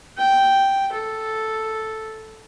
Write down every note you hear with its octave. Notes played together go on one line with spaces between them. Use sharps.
G5
A4